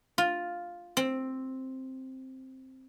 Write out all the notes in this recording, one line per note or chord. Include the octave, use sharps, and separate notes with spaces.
F4
C4